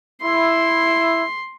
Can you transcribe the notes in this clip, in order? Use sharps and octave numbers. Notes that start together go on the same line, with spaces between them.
E4 C6